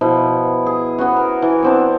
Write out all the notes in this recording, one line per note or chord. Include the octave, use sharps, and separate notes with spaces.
B2 F3 E4
G#4
B3 C#4 F#4
A#4
E3
B3 C4 D4